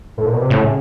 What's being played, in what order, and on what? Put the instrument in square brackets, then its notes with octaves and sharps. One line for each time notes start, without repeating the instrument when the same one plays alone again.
[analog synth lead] A2
A#2
B2
C3
[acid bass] A2 [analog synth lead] C#3